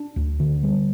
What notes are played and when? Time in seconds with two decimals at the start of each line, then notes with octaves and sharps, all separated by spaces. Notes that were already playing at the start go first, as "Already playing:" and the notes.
Already playing: D4
0.16 D2
0.40 D3
0.63 G3